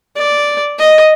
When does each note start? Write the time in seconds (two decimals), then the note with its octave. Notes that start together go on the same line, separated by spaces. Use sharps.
0.16 D5
0.78 D#5